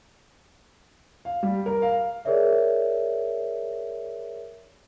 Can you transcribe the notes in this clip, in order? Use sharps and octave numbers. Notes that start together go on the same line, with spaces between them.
F5
G3
A#4
F5
G#4 A#4 C#5 D5 E5